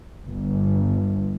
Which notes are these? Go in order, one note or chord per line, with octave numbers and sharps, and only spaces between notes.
G1